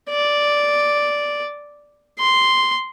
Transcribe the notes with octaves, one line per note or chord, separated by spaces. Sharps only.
D5
C6